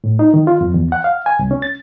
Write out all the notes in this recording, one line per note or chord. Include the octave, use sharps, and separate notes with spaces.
A2
D#4
D#3
F4
F2
E2
F#5
F5
G#5
C2
C#4
A6